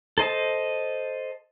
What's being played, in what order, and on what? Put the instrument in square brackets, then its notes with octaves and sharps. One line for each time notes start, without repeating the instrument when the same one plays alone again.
[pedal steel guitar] A4 C5 D#5 A5